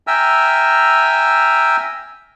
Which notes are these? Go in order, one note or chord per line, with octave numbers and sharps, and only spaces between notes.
E5 G5 G#5 A#5 E6 F6